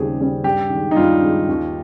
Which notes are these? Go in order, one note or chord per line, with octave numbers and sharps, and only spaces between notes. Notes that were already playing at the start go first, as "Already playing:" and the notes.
Already playing: D#2 C#3 G3 C4 G4 G#4
C#3 G3 C4
G2 G4
D#3
G#3
D#4
G2 F4
D#3 G#3
D#2